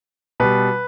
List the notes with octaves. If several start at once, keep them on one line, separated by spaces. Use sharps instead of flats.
B2 G3 B4